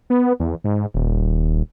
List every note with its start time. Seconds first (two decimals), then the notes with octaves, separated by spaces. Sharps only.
0.10 B3
0.40 E2
0.64 G#2
0.94 D#1